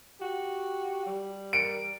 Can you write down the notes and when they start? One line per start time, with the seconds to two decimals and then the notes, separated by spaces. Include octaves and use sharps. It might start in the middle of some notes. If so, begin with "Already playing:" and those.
0.21 F#4 G4
1.06 G3
1.53 A#4 C#7 D7